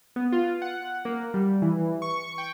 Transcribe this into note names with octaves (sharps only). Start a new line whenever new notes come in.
B3
F4
F#5
A#3
G3
E3
C#6
G5